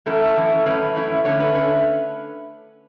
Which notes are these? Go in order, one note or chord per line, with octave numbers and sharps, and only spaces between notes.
F#2 E3 A3 C#4 E4 A4
F#2 E3 A3 C#4 E4
F#2 E3 A3 C#4 E4 B4
F#2 E3 A3 C#4 E4
D3 A3 C#4 C#5
B4
D3 A3 C#4